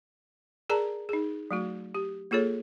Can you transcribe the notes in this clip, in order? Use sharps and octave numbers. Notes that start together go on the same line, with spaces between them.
G#4 A#4 D5 A5 A#5
D#4 G#4
F#3 A3 F#4
G4
A#3 F4 G#4 A4 C#5